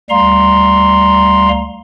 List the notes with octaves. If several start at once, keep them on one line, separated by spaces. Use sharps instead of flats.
D2 G3 F5 A#5 C6